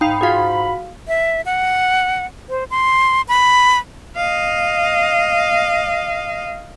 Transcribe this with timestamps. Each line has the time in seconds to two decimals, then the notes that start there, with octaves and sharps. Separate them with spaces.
0.01 G#2 D#4 F5 G5 B5
0.21 F4 F#4 G#4 F5
1.08 E5
1.46 F#5
2.49 C5
2.70 C6
3.28 B5
4.16 D#5 F5